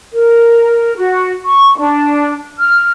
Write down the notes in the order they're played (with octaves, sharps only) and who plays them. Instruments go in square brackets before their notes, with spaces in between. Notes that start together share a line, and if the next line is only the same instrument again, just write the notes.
[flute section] A#4
F#4
C#6
D4
F6